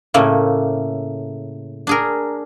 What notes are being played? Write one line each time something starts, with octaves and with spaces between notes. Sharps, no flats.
A2 C#3 A3 A#3
D4 G#4 A#4